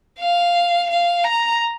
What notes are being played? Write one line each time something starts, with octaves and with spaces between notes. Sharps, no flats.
F5
F5
A#5